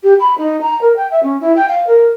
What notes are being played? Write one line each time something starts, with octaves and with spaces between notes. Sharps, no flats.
G4
B5
D#4
A#5
A#4
G5
E5
C#4
E4
G5
F5
A#4